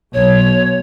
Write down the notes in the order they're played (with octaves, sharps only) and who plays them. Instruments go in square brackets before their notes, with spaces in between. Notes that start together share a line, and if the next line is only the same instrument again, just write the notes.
[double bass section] B1 [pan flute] C#5